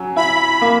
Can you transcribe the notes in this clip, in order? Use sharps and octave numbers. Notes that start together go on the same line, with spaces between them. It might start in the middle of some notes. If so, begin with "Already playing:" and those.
Already playing: F#3 C#4
E4 B5
A#3